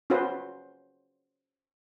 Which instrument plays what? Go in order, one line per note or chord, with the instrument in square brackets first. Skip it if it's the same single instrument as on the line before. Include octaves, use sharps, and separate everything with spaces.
[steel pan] C#4 F4 F#4 B4 C5